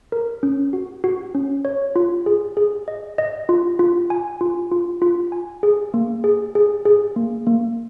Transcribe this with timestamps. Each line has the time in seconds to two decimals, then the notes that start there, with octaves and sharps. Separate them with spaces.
0.12 A#4
0.43 C#4
0.73 F#4
1.04 F#4
1.35 C#4
1.65 C#5
1.96 F4
2.26 G#4
2.57 G#4
2.88 D#5
3.18 D#5
3.49 F4
3.79 F4
4.10 G#5
4.41 F4
4.71 F4
5.02 F4
5.32 G#5
5.63 G#4
5.94 A#3
6.24 G#4
6.55 G#4
6.85 G#4
7.16 A#3
7.47 A#3